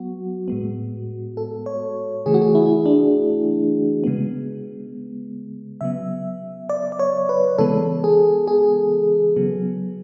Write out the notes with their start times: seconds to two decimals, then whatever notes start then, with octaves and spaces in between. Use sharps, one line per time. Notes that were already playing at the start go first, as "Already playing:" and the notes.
Already playing: F#3 B3 F#4
0.48 A2 G#3 B3
1.37 A4
1.66 C#5
2.26 C#3 E3 A3 G#4
2.34 F#4
2.42 G#4
2.55 E4
2.86 D4
4.04 C#3 G#3 B3
5.81 C#3 F#3 B3 E5
6.69 D5
6.92 D5
6.99 C#5
7.29 B4
7.59 C#3 E3 G#3 B3 A4
8.04 G#4
8.48 G#4
9.36 C#3 F#3 B3